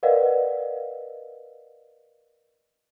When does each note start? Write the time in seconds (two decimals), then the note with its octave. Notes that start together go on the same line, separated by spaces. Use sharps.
0.03 A#4 B4 D5 D#5 F5 F#5